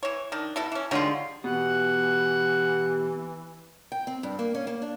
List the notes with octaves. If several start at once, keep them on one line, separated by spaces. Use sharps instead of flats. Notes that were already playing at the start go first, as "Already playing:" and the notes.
E3 C#5
D#3 D4
B2 E4 A4
E3 C#4
D3 D#3 G3 G#3 F4 C#5
B2 E3 G4 F#5
G5
C4
G2
A#3
C#4
A#3
D4